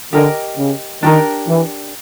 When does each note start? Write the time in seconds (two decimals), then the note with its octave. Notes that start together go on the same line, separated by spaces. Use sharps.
0.13 D3 G4 A#4 D#5 G#5
0.58 C#3
1.03 D#3 D4 G4 A#4
1.48 E3